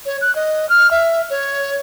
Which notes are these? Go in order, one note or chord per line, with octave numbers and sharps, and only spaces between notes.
C#5
F#6
D#5
F6
E5
C#5